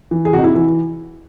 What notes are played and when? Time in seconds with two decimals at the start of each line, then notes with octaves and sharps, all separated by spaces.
0.11 E3
0.25 G#4
0.33 C3 F#4
0.38 D#4
0.44 E4
0.55 E3 E4